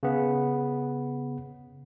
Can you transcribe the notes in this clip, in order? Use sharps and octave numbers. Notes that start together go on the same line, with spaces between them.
C#3 B3